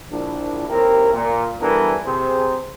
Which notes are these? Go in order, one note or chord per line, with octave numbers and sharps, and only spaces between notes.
A#1 D4 E4
D#2 C4 E4 G4 A#4
A#2
E3 G3 B3 D4 A4 A#4
C3 G#4 C5